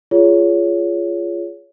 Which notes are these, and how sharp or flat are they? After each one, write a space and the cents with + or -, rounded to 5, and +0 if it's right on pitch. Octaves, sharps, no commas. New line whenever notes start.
F4 -20 G#4 +0 C#5 +25